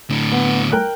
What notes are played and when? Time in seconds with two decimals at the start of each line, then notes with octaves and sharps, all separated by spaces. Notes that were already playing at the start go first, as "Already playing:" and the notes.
0.10 A2 D3
0.32 B3
0.72 A#4 G5 F#6